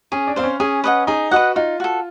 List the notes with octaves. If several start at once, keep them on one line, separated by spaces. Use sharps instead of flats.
C#4 G#4
D4
C4 C5 F5
C#4
C#4 G#4
B4 D#5 F#5
D#4 G#4
F#4 B4 D#5 F#5
D#4 F4
F#4 A4